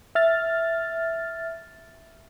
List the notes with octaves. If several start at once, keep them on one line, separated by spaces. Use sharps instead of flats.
E5 F6 A6